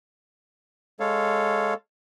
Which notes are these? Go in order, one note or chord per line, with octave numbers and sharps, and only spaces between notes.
G#3 A4 C#5 F5